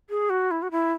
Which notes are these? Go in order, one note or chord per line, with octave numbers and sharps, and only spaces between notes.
G#4
F#4
E4
F#4
E4